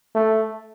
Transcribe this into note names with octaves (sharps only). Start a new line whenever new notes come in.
A3